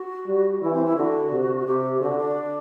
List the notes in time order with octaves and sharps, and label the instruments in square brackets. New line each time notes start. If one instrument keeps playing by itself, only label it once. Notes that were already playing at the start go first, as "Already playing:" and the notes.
Already playing: [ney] F#4
[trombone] G3
[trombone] E3 [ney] E4
[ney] C4
E4
[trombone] D3 [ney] F#4
[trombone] C3
[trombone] C3 [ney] G4
[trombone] D3 [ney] F#4
[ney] D4